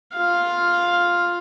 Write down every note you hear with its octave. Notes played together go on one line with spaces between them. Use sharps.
F4 F5